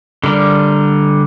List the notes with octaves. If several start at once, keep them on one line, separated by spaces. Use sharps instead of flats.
D3 G3 A#4